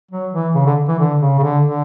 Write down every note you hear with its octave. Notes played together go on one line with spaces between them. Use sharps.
F#3
E3
C#3
D3
E3
D3
C#3
C#3
D3
D3